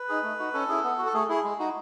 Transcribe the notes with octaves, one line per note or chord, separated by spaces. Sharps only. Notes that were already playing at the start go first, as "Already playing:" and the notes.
Already playing: B4
D#4 G#4
A3
D#4 F#4
C#4 A4
E4 G#4
B3
F#4
A4
A3 G#4
E4 G#4
G#3
D#4 F#4